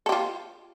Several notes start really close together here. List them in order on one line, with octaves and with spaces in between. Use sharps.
A4 G4 F4